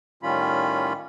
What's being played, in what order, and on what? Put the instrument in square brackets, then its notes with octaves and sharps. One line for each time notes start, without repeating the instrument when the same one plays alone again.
[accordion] A2 D#3 G3 C#4 F4 B5